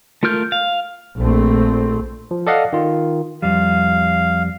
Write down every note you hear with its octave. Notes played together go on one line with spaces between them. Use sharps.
A3 F4 A#4 F6 G6
F5
A#1 A3 C4
F3
A4 D5 D#5 F5 F#5
D#3 F4
F2 G3 F5